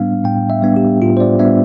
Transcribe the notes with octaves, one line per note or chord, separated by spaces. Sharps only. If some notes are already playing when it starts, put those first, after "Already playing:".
Already playing: A2 G3 B3 D4 F5
A2 G5
E5
G3 B3 D4
G4
A2 F4
C5
D5
G3 B3 D4 E5